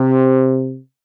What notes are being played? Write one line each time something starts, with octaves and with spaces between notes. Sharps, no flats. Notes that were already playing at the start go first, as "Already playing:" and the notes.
Already playing: C3